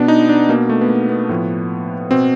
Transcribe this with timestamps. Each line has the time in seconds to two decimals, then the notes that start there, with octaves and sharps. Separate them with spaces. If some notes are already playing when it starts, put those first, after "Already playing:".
Already playing: B2 B3 D4
0.08 D#4
0.29 D4
0.49 B2 A#3
0.69 A3
0.81 B3
0.89 A#3
1.09 B3
1.29 A2 F3
2.11 B2 C4